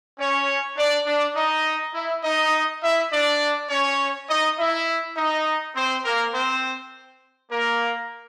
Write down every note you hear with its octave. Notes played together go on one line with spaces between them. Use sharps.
C#4 C#5
D4 D5
D4 D5
D#4 D#5
E4 E5
D#4 D#5
E4 E5
D4 D5
C#4 C#5
D#4 D#5
E4 E5
D#4 D#5
C4 C5
A#3 A#4
C4 C5
A#3 A#4